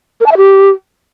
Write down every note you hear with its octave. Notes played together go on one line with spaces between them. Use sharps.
A#4
A5
E5
G4